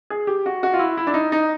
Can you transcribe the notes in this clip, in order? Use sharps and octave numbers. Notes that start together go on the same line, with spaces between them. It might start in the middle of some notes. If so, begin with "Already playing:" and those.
G#4
G4
F#4
F#4
F4
E4
E4
D4
D#4
D#4